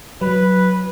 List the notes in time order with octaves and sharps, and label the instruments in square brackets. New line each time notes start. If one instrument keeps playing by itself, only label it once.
[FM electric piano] F#3 [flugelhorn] B4